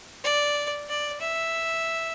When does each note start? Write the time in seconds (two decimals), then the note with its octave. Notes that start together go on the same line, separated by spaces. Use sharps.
0.24 D5
0.89 D5
1.21 E5